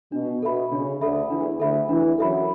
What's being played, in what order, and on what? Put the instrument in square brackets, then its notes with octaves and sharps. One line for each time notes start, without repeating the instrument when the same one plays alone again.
[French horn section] B2 [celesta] D4
[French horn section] B2 [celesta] A4 E5 B5
[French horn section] C#3 [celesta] D4
[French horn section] D2 D3 [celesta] A4 E5 B5
[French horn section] E2 E3 [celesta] D4
[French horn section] D2 D3 [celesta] A4 E5 B5
[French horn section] E2 E3 [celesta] D4
[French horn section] F#2 F#3 [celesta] A4 E5 B5